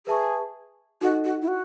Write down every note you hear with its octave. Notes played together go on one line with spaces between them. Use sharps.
G#4 B4 E5 A5 C#6
D#4 F#4 A4 D#5
F#4
E4
F#4